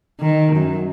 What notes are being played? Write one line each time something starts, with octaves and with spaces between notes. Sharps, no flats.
D#3
F#2